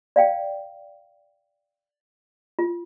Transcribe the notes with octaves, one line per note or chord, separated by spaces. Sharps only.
D5 F5 G5
F4